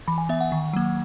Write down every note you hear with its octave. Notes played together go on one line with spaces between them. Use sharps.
E3 B5
G#5
B3 E5
F#5
D#3
F#3 A#3